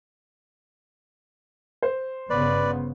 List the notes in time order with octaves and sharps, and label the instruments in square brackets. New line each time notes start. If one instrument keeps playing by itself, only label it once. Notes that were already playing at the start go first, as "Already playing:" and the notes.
[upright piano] C5
[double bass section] G1 C#3 B3 [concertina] B4 D5